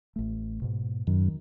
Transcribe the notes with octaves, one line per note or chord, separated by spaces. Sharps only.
A1 A3
G#2 B2
F#2 D#3